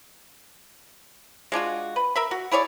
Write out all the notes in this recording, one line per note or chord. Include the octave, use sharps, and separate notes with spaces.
G#3 D4 F4 F#4
B4
A#4 E5 B5
F#4
E4 G#4 C#5 D5